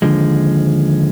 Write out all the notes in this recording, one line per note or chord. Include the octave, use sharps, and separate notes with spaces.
D#2 D3 F3 G#3